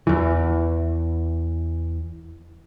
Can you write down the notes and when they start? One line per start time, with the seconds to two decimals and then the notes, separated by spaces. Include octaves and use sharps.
0.07 E2 E3